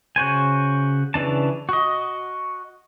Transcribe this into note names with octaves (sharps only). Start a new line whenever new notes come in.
C#3 F#4 C5 G#5
C#3 E3 D4 A5
F#4 D#5